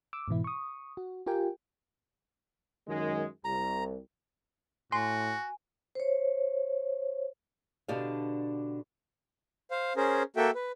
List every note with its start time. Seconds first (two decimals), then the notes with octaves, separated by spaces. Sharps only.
0.13 D6 E6
0.28 G#2 B2 E3 E4
0.44 C#6 D#6
0.97 F#4
1.26 F4 G4 A#4 G5 G#5
2.87 F#2 D#3 G#3
3.45 C2 A#5
4.92 A2 F#4 G#5 C6
5.95 C5 C#5
7.88 B2 D3 D4 G4 D#5 F5
9.71 C5 F5
9.96 C#4 G#4 A#4 C5
10.36 A#3 F#4 A4 E5 G5
10.55 B4